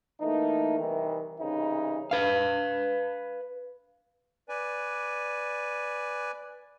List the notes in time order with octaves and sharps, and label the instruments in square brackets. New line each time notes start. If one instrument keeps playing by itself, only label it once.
[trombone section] E3 A3 A#3 D#4
C2 D#3 E3
C2 C#3 E3 D#4 B4
[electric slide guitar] B4 F5
[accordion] B4 D5 G#5